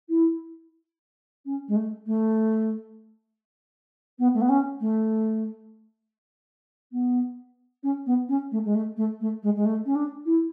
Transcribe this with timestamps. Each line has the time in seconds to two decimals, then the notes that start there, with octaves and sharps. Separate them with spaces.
0.09 E4
1.45 C#4
1.68 G#3
1.76 A3
2.06 A3
4.18 B3
4.34 A3
4.41 B3
4.49 C#4
4.80 A3
6.92 B3
7.83 C#4
8.06 B3
8.28 C#4
8.51 A3
8.64 G#3
8.74 A3
8.96 A3
9.20 A3
9.42 G#3
9.55 G#3
9.65 A3
9.85 C#4
9.95 D4
10.25 E4